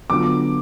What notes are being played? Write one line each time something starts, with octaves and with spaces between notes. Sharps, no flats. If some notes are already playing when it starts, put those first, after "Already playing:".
D3 F#3 B3 D4 F4 D6